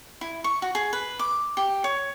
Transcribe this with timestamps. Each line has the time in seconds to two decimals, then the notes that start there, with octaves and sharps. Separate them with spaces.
0.21 E4
0.44 C#6
0.62 F#4
0.75 G#4
0.93 B4
1.19 D6
1.57 G4
1.84 C#5